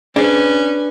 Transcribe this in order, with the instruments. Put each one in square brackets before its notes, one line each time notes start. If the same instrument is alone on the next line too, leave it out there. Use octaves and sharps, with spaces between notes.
[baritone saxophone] C#4 [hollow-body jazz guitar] D4 [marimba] G#4 C5 [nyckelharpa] B4